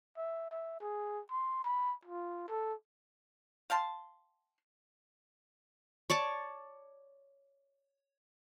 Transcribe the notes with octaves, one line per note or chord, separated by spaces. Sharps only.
E5
E5
G#4
C6
B5
F4
A4
F5 G5 A5 C6
C#5 D5 A5 D6